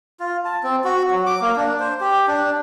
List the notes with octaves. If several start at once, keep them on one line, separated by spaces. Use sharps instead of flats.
F4
A5
C4
F#4
F#3
D6
A#3
D4
C5
G4
D4